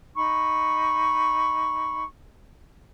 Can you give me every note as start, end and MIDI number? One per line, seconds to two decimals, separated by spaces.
0.16 2.04 63
0.16 2.04 83
0.16 2.04 85